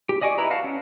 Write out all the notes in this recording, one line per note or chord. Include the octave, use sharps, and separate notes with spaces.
G4
D5 D#5 G#5 C#6 D6
E4 B4 A#5
F#4 F5 A5
C#4